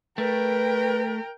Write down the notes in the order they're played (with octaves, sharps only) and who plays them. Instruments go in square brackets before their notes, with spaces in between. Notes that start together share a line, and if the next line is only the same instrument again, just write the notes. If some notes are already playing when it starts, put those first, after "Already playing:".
[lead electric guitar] A3 [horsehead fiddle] A#4 G5 [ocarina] B4